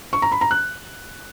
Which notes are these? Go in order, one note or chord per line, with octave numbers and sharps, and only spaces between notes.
C#6
A#5
B5
A#5
F#6